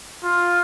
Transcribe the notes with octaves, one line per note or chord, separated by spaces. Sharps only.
F4